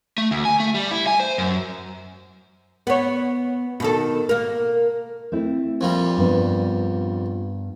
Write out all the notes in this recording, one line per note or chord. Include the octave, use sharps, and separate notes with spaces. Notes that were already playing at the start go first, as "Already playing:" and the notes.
A3
D2
G#5
A3
G3
E4
G#5
C5
F#2
B3 C#5
B2 D#3 A4
A#3 A#4
A3 C4 E4
F2 A#2 G3
G2 B3 D4